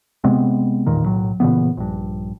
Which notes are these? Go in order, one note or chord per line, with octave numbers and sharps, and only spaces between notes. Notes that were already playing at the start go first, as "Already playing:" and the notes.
C3 G#3 B3 C4
A1 E2 A#2 D#3
B1 A2 F#3
A#2 C#3 E3 B3
A#1 G2